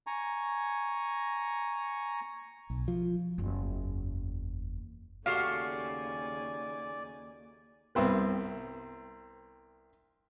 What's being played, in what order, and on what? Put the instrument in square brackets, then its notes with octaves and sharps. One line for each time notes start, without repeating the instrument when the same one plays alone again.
[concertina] G#5 A#5 C#6
[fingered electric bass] B1
F3
[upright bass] F#1 E2
[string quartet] D#2 C#3 G#5 [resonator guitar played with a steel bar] A3 F#4 G4 [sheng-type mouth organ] D5 [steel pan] F5
[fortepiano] C2 B3 C4 B4